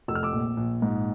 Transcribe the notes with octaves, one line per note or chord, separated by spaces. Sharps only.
F1 E6
F6
D6 E6
A#1
A#1
G#2